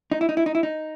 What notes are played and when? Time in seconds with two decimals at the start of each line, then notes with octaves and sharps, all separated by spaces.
0.11 D#4
0.21 E4
0.29 D#4
0.37 E4
0.46 D#4
0.55 E4
0.63 D#4